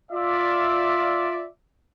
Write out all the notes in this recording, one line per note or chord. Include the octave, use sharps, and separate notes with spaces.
F4 D5 E5